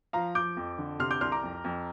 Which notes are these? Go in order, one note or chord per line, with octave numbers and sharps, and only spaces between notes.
F3 F5 A#5
F3 D6 G6
F2
D3
C3 C6 F6
D6 G6
C2 C6 F6
A#5 D6
F2
F2